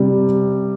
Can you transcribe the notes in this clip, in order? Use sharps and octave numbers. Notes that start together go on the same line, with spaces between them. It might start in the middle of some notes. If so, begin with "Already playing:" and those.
Already playing: C3 G3